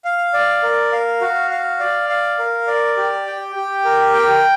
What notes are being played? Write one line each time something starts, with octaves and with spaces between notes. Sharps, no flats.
F5
D5
A#4
F5
F#4
F5
D5
F5
A#4
D5
G4
G5
G4
A#4
G5